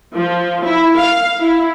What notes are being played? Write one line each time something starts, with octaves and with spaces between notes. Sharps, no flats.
F3
E4
F5
E4